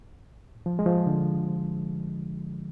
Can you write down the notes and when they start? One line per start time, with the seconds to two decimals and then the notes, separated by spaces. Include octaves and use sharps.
0.66 F3
0.79 G#3
0.86 F3
1.06 D3